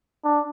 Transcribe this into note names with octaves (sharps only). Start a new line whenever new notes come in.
D4